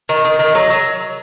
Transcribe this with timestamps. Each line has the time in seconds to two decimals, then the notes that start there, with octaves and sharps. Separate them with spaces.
0.09 D#3
0.25 D#3
0.39 D#3
0.55 F#3
0.70 F#3